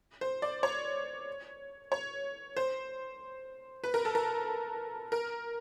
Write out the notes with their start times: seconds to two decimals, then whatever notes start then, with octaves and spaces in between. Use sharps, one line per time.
0.21 C5
0.42 D5
0.63 C#5
1.92 C#5
2.57 C5
3.84 B4
3.94 A#4
4.05 A4
4.15 A#4
5.12 A#4